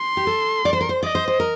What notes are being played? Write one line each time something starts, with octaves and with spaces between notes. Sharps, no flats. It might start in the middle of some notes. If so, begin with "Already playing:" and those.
Already playing: C6
G4
A4
D5
C5
A#4
C5
D5 D#5
C5
C5
A#4